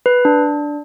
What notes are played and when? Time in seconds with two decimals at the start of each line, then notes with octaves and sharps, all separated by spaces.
0.06 B4
0.25 D4